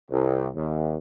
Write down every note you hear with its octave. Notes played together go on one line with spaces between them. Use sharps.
C2
D#2